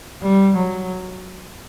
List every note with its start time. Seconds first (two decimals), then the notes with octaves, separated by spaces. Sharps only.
0.22 G3
0.57 F#3